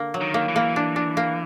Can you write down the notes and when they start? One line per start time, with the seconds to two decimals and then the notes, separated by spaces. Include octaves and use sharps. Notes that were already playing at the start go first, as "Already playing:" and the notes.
Already playing: D3 A#3
0.14 F#3
0.21 D#3
0.34 A#3
0.48 E3
0.56 A#3
0.76 D4
0.96 D4
1.17 A#3